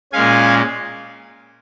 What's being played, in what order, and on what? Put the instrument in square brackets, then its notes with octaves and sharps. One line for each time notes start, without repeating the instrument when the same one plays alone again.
[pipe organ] A#2 G#3 C#4 F5 G#5